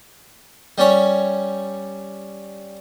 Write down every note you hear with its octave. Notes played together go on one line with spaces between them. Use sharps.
G3 C#4 C#5